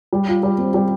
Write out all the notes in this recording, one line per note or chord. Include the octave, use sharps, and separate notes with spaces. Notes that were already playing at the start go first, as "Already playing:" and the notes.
G3
F4
G3
C4
G3